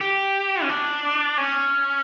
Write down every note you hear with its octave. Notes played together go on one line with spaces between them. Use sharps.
G4
C#4
D4
C#4